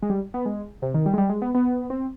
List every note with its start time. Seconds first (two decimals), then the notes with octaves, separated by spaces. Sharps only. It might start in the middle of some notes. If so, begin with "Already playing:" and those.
0.02 G#3
0.10 G3
0.34 B3
0.46 G#3
0.82 C3
0.94 D#3
1.06 G3
1.13 G#3
1.18 G3
1.29 G#3
1.42 B3
1.54 B3
1.90 C4